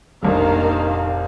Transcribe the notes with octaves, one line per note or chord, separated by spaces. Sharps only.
F1 A#1 D#3 A#3 F5